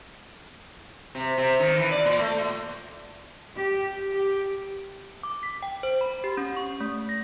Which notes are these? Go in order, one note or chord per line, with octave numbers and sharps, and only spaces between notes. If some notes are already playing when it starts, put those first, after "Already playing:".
C3
C3
D#3
E3
D5
A#2
A3
A#2
G4
G4
D6
B6
G5
C5
B5
G4
C#4
C#6
A3
A#6